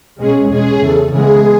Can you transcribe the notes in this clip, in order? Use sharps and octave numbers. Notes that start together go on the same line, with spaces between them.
B2 G#3 C#4 G#4
E2 B2 G#3 C#4 G#4
E2 C#3 E3 A4
C#3 E3 G#3 B3 G#4